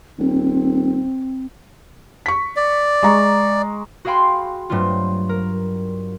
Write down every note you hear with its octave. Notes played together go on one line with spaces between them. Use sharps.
D#1 C4
C#6 B6
D5
G#3 A#5 C#6
F#4 G#4 F5 G5 B5 C6
G2 F#3 A3 C4 F4
A#4